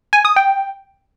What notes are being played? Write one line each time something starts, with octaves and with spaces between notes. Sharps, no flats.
G#5
D#6
G5